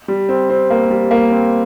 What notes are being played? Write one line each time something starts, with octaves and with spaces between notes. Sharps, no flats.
G3
C4
C4
A#3
G3
A#3
C4